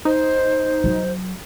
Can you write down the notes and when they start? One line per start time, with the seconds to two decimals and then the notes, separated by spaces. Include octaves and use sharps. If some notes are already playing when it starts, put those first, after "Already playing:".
0.05 D#4 C5
0.84 F#3